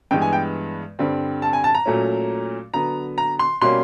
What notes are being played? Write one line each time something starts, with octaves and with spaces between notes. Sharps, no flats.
G2 E3 G#3 B3 G5
G#5
G5
G2 D3 G3 C4
A5
G#5
A5
A#5
A#2 F#3 A3 C#4
D3 F#3 B3 A#5
A#5
C6
B2 G3 A#3 C#4 C6